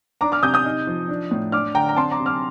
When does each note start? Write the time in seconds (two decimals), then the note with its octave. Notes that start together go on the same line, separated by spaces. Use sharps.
0.21 D4 A#5 D6
0.32 D6 F6
0.43 C3 D#6 G6
0.54 D#6 G6
0.65 D#4
0.87 F3
1.08 D4
1.31 A2
1.52 D4 D6 F6
1.75 D3 G5 A#5
1.89 A#5
1.96 C4 A5 C6
2.11 A#5 D6
2.19 C3
2.26 D6 F6